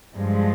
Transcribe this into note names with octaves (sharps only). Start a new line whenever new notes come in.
G2 F3 G#3